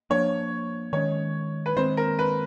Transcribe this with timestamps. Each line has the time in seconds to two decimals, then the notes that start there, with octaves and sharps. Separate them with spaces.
0.10 F3 A#3 D4 C#5
0.93 D#3 G#3 C#4 C#5
1.66 B4
1.77 D#3 G#3 C4 C5
1.97 A#4
2.19 B4